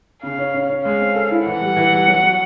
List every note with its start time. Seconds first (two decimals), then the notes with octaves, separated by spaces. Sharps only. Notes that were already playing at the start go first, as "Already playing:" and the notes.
0.23 C#3 F5
0.38 C#4
0.54 C#4
0.69 C#4
0.85 G#3 F5
1.00 C4
1.15 A4
1.31 E4
1.46 E3 F#5
1.61 G3
1.76 E3
1.92 G3
2.08 F#3
2.24 F#3